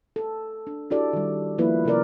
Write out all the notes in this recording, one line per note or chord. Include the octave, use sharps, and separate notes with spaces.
A4
D4
D4 E4 F#4 G4 A4 D5
D#3 G3
F3 A#3 B3 E4 B4
C3 C#4 A#4 D5